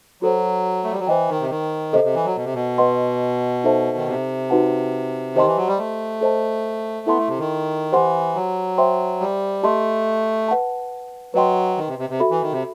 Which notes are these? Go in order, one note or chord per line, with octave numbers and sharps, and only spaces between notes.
F#3 F#4 A4 C5
A3
G3
F#3
E3 C5 D#5 G5
D#3
C3
D#3
C3 A4 C5 D#5
C3
E3
F#3
B2
C3
B2
B4 D#5 F#5 C6
D#4 A4 C5 E5 A5
D#3
C3
D#4 F#4 B4 F#5 A5
D#3 G4 C5 D#5 A5 C6
E3
F#3
G3
A3
A4 C5 D#5 A5
B3 E4 A4 E5 A5 C6
A3
C3
D#3
E3 G4 C5 F#5 C6
F#3
C5 E5 G5 C6
G3
A3 G4 D#5 A5 C6
B4 F#5 A5
F#3 B4 D#5 G5 C6
D#3
C3
C3
C3
F#4 A4 E5 B5
E3
D#3
C3